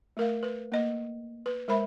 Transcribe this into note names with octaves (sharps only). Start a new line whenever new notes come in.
A3 A#4 F5
B4
A#3 D#5
B4
G#3 A#4 C5 E5 B5